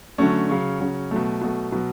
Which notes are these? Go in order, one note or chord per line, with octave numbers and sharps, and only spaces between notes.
D3 F#3 A3 C#4
C#3 F#3 C#4
C#3 F#3 C#4
B2 F#3 A3
B2 F#3 A3
B2 F#3